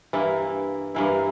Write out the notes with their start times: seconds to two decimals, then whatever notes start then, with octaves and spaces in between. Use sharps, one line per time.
0.13 G2 E3 A#3 E4
0.95 G2 E3 A#3 E4